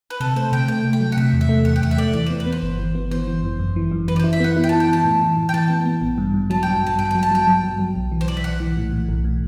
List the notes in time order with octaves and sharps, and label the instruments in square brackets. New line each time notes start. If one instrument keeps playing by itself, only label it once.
[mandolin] B4
[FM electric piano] C3 [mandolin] A4
[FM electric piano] A3 [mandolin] C5
[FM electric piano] C3 [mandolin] G5
[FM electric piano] A3 [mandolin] G5
[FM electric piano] A3
[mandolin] G5
[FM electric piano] F#3
[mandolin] F#5
[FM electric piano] C3 [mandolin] E5
[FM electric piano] E2
[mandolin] E5
[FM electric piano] A3
[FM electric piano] E2 [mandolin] F#5
[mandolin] G5
[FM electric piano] E2 [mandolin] F#5
[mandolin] E5
[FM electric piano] A3 [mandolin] D5
[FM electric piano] E3 [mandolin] D5
[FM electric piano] B3 [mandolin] C5
[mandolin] B4
[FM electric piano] B3
[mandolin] C5
[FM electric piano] G1
E3
B3
[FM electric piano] E3 [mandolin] C5
[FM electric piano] E3
F#2
F#2
E3
F#2
[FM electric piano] E3 [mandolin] B4
[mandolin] D5
C5
[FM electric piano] E4
[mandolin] E5
[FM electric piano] B3 [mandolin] F#5
[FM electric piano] E4
[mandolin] G5
A5
[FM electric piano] E4
[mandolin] G5
[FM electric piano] E3 [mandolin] A5
[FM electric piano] A2
E3
A2
[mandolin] G5
[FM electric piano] E3 [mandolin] A5
[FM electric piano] B3
B3
A1
G2
G2
[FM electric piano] F#3 [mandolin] A5
[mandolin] G5
[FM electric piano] G2
[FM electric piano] G2 [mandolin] A5
[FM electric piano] G2 [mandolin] G5
[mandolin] G5
[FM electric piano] F#3
[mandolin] A5
[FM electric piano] F#3 [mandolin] G5
[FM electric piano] F#3
G2
F#3
B1
E3
[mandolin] C5
[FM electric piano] B1 [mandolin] D5
[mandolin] E5
[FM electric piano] B1 [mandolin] F#5
[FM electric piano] E3
A2
A2
B1
A2